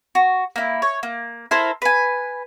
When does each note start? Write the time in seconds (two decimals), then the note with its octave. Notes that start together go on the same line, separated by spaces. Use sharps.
0.15 F#4
0.56 A#3 E4
0.82 C#5
1.03 A#3
1.51 E4 A4 A#4 C5
1.82 B4 G#5